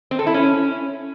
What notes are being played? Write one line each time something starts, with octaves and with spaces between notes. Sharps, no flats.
C4
A4
E4
C#4